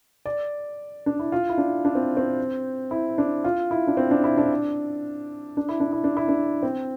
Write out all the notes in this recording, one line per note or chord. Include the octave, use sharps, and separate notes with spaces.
D5
D4
E4
F4
E4
D4
D4
C4
C4
E4
D4
F4
E4
D4
C4
D4
E4
D4
D4
E4
D4
E4
D4
E4
D4
C4